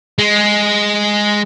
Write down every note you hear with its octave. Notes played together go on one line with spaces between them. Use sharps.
G#3